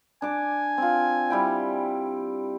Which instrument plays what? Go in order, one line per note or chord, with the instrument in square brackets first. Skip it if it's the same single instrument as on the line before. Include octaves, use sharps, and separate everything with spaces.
[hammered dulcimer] D4 D6 [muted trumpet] G#5
[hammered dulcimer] C4 F4
G3 E4 G5